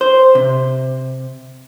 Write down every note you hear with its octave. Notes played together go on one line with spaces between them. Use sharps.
C5
C3